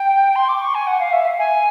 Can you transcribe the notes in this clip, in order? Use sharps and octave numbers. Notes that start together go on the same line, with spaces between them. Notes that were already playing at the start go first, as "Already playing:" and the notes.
Already playing: G5
C6
D6
C#6
G#5
F#5
F5
E5
G#5